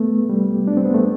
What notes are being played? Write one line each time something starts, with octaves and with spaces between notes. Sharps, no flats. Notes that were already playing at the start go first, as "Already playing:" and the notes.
Already playing: A3 B3
G3
D4
C4
B3
A3